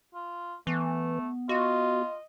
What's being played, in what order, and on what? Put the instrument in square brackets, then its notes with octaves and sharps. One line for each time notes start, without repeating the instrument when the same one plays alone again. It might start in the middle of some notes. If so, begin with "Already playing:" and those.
[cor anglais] F4
[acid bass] E3 [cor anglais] A3 [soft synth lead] B3
[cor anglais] F4 [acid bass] F#4 [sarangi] D#5